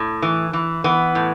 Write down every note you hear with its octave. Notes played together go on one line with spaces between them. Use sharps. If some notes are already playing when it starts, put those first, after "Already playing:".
Already playing: A2
E3
E3
E3 B3
A2